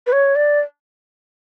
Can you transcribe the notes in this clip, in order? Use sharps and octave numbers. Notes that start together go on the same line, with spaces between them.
B4
C#5
D5